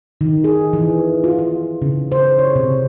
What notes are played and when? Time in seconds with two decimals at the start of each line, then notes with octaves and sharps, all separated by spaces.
0.21 D#3
0.44 G#4
0.73 E3
1.24 F4
1.39 F4
1.82 C#3
2.12 C5
2.39 C#5
2.56 C3